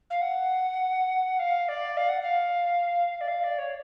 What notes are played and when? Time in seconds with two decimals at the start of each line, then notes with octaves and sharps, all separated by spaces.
0.10 F5
0.21 F#5
1.39 F5
1.68 D5
1.97 F5
2.09 F#5
2.22 F5
3.21 D5
3.28 F5
3.44 D5
3.58 C#5